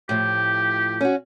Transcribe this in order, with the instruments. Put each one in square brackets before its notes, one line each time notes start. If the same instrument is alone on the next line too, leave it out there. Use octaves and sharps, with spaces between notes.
[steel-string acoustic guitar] A2 F3 [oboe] G4
[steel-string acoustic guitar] C#4 F#4